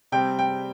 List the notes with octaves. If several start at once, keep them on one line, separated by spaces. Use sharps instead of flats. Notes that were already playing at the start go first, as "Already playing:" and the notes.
C3 G3 C4 G5
G5